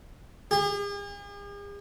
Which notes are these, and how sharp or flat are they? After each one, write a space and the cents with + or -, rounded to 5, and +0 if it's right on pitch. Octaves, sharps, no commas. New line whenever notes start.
G#4 -45